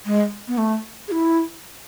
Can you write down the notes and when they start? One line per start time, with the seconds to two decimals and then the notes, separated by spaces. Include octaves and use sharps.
0.06 G#3
0.48 B3
0.58 A3
1.08 G#4
1.12 E4